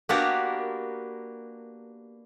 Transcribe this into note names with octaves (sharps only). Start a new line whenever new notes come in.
A#3 B3 D4 F#4 G4 A#4